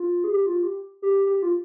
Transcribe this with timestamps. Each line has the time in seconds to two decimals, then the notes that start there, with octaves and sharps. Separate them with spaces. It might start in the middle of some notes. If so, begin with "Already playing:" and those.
Already playing: F4
0.24 G#4
0.31 G4
0.46 F4
0.63 G4
1.02 G4
1.27 G4
1.42 F4